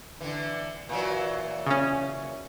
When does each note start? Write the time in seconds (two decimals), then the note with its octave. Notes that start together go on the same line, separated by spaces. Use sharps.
0.21 D3 E3
0.89 A#2 E3 F#3
1.67 C#3 C#4